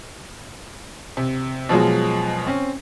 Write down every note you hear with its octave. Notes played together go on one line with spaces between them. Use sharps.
C3
B2 F3 F#3 G#3
C4 C#4